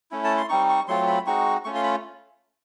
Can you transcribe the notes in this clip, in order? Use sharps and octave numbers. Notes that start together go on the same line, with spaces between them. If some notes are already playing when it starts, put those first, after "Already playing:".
A3 C#4 E4
A5
C6
G3 C4 D#4 C#6
C#6
F#3 A3 C4 F4 C6
B5
G#3 C4 D#4 F#4 C#6
A3 C#4 F4 C#6
C6
B5